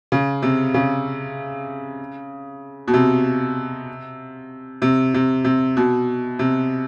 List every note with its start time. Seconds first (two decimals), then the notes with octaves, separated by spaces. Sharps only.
0.12 C#3
0.42 C3
0.74 C#3
2.88 B2
2.94 C3
4.82 C3
5.14 C3
5.45 C3
5.77 B2
6.39 C3